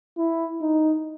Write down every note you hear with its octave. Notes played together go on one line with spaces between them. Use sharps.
E4
D#4